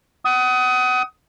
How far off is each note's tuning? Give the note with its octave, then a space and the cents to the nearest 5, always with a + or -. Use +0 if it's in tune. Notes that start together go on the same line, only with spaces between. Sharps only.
F#5 +30 D#6 +20